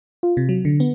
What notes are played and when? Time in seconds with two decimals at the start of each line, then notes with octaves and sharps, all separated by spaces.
0.23 F4
0.37 C3
0.49 F#3
0.65 D3
0.80 B3